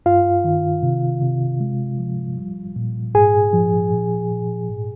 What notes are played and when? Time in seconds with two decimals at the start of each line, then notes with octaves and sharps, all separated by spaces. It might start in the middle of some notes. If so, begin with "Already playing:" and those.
0.06 G2 F4 F5
0.44 D#3
0.83 C3
1.22 C3
1.60 G#3
1.99 F3
2.38 G3
2.76 A#2
3.15 G#2 G#4 G#5
3.53 F3
3.92 A#2
4.31 A#2
4.69 G#2